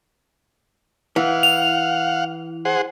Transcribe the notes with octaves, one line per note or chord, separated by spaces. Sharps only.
E3 F5 F#5
F7
G#4 C5 F#5